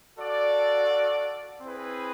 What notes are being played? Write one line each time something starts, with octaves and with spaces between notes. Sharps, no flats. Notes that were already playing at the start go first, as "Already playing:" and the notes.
F#4 A4 D5 F5
C4 E4 G#4 B4